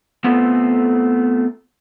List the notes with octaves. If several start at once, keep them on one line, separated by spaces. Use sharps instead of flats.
A3 B3 C4 F4 A4